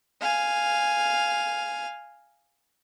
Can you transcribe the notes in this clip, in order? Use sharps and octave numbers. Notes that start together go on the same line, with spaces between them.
F5 G#5